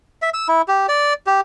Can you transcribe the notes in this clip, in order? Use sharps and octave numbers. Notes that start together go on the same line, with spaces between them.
E5
E6
E4
G4
D5
G4